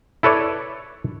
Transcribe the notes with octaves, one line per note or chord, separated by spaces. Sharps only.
E4 A4 B4 C#5 D5